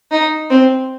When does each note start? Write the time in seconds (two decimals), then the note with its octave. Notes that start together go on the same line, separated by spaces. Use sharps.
0.11 D#4
0.50 C4